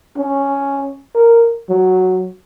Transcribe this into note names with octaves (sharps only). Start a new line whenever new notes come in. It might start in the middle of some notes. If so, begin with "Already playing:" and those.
C#4
A#4
F#3